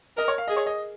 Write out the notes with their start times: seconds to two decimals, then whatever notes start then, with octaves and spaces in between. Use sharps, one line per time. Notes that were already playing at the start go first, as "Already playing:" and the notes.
0.17 A#4 D#5
0.28 C#5
0.38 F5
0.48 G#4 D#5
0.57 C#5
0.66 D#5